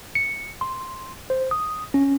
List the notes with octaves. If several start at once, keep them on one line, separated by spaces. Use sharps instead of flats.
C#7
C6
C5
D#6
C#4